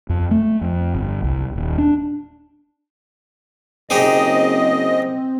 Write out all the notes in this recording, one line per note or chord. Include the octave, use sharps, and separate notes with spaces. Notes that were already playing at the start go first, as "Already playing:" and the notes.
F2
A3
F2
G1
C2
D#1
D4
F#1 C4 D#4 G4 G#4 D#5